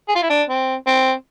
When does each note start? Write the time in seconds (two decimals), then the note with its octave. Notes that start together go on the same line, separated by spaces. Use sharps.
0.08 G#4
0.15 F4
0.23 E4
0.30 D4
0.49 C4
0.87 C4